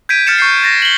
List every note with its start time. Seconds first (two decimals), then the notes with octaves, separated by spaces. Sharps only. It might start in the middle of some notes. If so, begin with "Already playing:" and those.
0.09 G6 G#6 B6 D7 D#7
0.27 F6 A6 C#7 E7
0.38 C#6 G6 C7
0.64 A6 A#6
0.82 F#7 G7